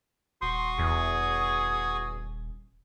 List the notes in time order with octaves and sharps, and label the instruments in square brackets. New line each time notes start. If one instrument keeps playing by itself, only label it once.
[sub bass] D#1 [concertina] F#4 C#6 D#6 [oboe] C6
[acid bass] E2 [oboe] G#4